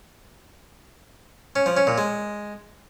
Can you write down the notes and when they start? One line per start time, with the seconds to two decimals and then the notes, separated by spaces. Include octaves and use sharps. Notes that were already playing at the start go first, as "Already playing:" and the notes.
1.56 C#4
1.66 F3
1.77 C#4
1.87 A#2
1.98 G#3